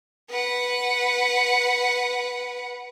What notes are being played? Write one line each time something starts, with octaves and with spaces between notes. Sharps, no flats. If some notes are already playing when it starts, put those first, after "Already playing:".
B4 F#5